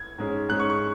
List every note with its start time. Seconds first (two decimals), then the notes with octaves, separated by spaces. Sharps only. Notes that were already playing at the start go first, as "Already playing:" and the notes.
Already playing: G#6
0.18 G#2 G#3 C#4
0.49 G#2 G#3 C#4 F#6
0.60 C#6
0.70 C#6